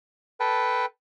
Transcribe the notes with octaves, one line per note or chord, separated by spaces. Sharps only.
A4 B4 G5 A5